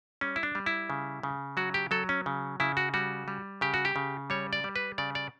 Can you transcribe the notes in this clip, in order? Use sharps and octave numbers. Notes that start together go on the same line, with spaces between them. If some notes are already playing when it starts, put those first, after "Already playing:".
G3 C#4
E4
D4
G3
E4
C#3
C#3
F#3 F#4
G4
F#3 A4
C#4
C#3
C#3 E4
F#4
G3 F#4
G3
C#3 G4
F#4
G4
C#3
G3 C#5
D5
G3
B4
C#3 D5
D5